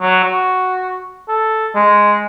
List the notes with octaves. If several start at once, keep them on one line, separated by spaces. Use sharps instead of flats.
F#3
F#4
A4
G#3